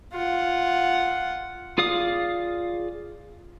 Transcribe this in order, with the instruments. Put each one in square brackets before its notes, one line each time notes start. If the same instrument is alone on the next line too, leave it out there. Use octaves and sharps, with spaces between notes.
[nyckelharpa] F4 F#5
[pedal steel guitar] F4 G#4 D5 F5 D#6